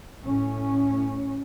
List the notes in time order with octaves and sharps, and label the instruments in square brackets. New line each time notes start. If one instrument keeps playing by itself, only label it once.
[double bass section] A2 C#4